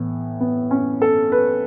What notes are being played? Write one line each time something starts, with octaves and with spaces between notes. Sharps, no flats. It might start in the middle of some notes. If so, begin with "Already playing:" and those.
Already playing: A2 E3 B3
B3
C#4
A4
B4